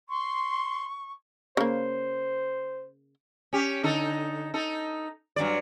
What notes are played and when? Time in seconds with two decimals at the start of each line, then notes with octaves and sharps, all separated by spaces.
0.08 C6 C#6
1.57 C#3 A#3 C5
3.53 C#4 G4
3.83 D3 D#4 A4
4.54 D#4 A4
5.36 G2 F#3 D5